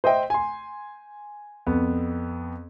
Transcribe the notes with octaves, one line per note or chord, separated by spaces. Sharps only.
C5 D#5 E5 G5
G#5 C6
F2 B3